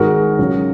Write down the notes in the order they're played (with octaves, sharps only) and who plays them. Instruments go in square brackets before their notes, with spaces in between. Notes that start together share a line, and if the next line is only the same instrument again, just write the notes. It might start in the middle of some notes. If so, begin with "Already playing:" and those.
Already playing: [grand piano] G#1 G#2 G#3 F#4 A#4
C#2 C#3 F#3